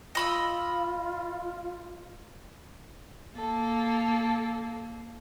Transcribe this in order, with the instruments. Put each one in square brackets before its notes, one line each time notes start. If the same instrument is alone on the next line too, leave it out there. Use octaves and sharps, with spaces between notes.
[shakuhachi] F4 [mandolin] D#5 B5 E6
[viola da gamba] A#3 [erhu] A4